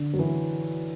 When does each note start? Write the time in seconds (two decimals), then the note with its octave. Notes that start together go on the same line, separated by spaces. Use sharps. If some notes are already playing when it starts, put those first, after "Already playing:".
Already playing: D3
0.14 F#3
0.19 E3